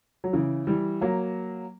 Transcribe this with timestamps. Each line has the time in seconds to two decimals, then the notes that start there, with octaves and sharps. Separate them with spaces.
0.24 F#3
0.33 C#3 E3
0.67 E3 G3
1.01 F#3 A#3